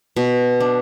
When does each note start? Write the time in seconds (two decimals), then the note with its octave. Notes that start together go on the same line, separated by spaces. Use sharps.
0.16 B2
0.60 D4